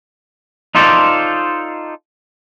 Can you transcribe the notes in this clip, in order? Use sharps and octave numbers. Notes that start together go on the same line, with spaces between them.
D#4 F4 A4 C5 D5